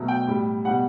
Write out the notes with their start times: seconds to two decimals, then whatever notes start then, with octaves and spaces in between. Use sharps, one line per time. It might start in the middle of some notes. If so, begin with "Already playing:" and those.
Already playing: B2 F#3 A3
0.08 G5
0.27 A2 G3
0.65 B2 G3 F#5